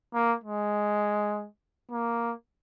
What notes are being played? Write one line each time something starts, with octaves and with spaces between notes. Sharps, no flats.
A#3
G#3
A#3